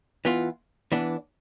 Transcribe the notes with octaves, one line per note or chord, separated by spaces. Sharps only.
E3 B3 F4
E3 B3 D4